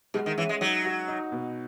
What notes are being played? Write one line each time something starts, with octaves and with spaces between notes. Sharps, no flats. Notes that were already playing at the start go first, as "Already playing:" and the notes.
B2 G#3
D#3
E3 C#4
G#3
F#3 D#4
F#4
D#4
B2